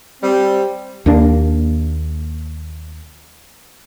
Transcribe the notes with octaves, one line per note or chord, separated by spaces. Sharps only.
G3 C4
D#2 A#3 D4